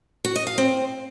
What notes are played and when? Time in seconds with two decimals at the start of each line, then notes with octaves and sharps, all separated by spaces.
0.25 F#4
0.36 D#5
0.47 F5
0.58 C4